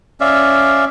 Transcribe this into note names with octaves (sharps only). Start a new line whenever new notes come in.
C#4 D5 E5 F5